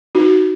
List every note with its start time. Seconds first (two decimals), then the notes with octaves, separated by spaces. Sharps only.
0.15 D#4 F#4